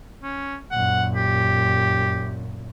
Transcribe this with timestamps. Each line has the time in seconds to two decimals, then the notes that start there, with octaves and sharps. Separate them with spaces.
0.23 C#4
0.72 F#2 A#2 F#5
1.16 G4